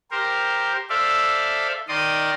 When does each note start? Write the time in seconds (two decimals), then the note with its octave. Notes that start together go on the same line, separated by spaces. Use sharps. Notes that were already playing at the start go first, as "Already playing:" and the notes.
0.11 G4 A#4 C5
0.90 A4 C5 D5 E5 F5
1.88 D#3 D5 D#5 C6 D#6